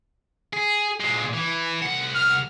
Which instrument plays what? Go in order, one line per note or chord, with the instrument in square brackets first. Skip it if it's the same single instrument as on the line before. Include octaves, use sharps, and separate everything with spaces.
[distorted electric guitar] G#4
A#2 G#3
E3
C2 F#5
[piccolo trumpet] F6